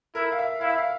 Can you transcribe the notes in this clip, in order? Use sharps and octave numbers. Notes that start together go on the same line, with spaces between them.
E4 A#4
F5
E5
E4 F5
E5
F5